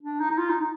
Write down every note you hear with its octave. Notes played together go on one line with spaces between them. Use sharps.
D4
D#4
D#4
F4
D#4
D#4